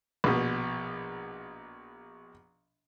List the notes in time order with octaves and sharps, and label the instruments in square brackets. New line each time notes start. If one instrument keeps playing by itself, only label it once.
[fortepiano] A#1 B2